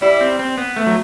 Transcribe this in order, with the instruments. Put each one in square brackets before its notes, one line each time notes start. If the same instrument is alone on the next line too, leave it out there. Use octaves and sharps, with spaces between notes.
[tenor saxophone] G3 [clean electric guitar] E4
[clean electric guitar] C4
C4
B3
A3
F#3